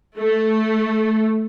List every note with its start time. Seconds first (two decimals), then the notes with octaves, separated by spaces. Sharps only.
0.18 A3